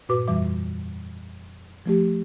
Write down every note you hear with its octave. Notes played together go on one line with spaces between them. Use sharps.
G2 A#2 F#4 B4 D6
F2 E3 G3 E5 D6
F3 A3 G4